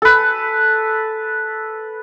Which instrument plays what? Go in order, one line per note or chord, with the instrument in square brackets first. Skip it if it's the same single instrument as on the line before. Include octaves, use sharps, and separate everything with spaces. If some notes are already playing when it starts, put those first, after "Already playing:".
[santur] A4 B4